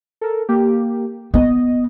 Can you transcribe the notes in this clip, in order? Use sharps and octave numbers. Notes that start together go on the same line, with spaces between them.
A4 A#4
A#3 G4
B3 D#5